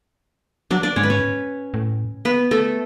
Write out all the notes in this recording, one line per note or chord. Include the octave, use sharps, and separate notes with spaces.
F#3 D4 D5
D4 D5
G#2 C#4 C#5
B4
C#4 C#5
A2
B3 B4
A3 A4